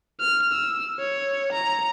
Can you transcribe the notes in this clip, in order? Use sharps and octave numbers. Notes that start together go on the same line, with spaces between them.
F6
E6
C#5
A#5